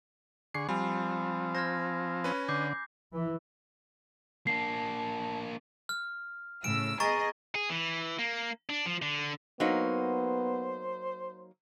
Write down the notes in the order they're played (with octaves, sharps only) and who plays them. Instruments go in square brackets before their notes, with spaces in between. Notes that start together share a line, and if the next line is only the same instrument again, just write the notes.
[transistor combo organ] D3 G#4 C#6 [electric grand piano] C7
[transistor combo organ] F3 C4 [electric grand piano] G3 [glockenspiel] G#5 B5
[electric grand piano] C5 [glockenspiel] F6 G#6 A#6
[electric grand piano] C#4 B4
[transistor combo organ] D3 [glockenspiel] D6 G6 C7
[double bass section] E3
[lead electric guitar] A#3 D4 [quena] A5 [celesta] C7
[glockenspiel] F6
[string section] A2 C#3 E6 [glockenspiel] D7
[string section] B3 G#4 D#5 [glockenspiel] A#5 C#6 A6
[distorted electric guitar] G#4
E3
A#3
D4
F3
D3
[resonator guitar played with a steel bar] F#3 A#3 D#4 [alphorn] B3 [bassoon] C5